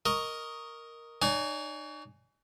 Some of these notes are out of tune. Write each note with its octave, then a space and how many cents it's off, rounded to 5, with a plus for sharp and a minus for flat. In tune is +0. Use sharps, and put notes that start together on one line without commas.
A#4 +0 D#5 +0 C#6 +0
D#4 -45 C#5 +40 G#5 +0